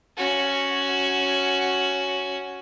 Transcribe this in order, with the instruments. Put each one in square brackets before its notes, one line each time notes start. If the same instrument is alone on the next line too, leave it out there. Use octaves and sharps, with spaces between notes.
[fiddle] C#4 F#4